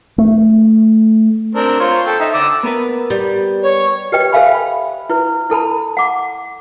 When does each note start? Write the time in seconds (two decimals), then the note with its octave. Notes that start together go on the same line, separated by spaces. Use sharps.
0.18 A3
1.55 C4 D4 A#4
1.80 F4 C5 C#5
2.06 A4 G5
2.20 D#4 E5
2.34 A5 D6 E6
2.63 B3 A#4 B4
3.10 G3
3.63 C#5
4.12 G4 B4 D#5 G5
4.32 A4 C5 E5 F5 G#5 B5
4.55 B5
5.10 E4 B4
5.50 E4 A4 A5 B5
5.97 F#5 D6